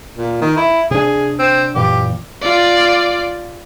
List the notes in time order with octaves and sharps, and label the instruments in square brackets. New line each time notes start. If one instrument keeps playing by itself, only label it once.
[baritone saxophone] A#2
D#3
E4
[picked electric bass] C3 D4 [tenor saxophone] G#4
[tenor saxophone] C4
[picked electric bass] F#2 A#2 E3 [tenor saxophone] G4
[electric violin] F4 D5